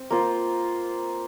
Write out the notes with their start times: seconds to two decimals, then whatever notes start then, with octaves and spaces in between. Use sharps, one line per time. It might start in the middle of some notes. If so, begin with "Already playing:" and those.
Already playing: C4
0.10 A#3 F4 C5